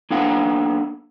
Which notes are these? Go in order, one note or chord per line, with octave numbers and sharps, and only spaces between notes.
A#3 B3 D4 A4 F5 F#5